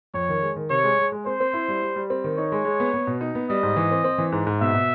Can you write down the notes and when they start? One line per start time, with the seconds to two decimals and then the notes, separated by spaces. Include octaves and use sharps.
0.14 F2 C#5
0.29 D#3
0.42 G#3
0.56 D#3
0.70 C3 C#5
0.84 G#3
0.99 G#3
1.12 G#3
1.26 C4 C5
1.40 C4
1.54 E4
1.68 G3
1.82 G3
1.96 G3
2.10 C4
2.24 D#3
2.37 D#4 C#5
2.52 G#3
2.65 G#3
2.80 B3
2.94 B3
3.07 B2
3.21 D#4
3.35 B3
3.49 G3 D#5
3.63 G#2
3.76 E3
3.91 C4
4.04 C4
4.18 E3
4.32 G#2
4.47 G#2
4.61 B2 E5
4.74 B2